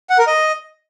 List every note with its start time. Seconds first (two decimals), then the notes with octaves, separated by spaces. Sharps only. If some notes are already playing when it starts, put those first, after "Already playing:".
0.10 F#5
0.18 A#4
0.27 D#5